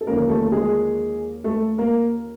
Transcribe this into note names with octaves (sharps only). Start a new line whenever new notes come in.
A4
D#2 D3 F3 A#3 C#4 A#4
A#4
A3 A4
G#3 G#4
A3 A4
A#3 A#4